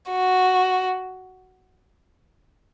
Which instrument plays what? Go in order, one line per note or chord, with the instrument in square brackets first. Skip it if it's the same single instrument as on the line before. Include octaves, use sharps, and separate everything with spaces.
[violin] F#4